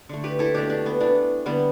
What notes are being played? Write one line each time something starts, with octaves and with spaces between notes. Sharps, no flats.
D3 A3
G4 B4
E4 A4
B2 A3 D4 G4
D4
B3
E3 A3 D4
D3 G3 B3